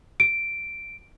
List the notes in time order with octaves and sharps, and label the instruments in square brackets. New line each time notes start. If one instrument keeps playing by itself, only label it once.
[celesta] D7